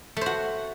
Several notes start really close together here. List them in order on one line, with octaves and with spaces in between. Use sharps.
A3 C5 F#4